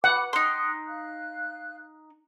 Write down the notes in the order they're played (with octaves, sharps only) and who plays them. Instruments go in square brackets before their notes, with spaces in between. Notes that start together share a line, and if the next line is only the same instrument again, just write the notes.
[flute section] B4 B5 D6 [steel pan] F#5
[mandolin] D#4 C6 [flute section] G5 D#6 F#6
[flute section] F5 F#6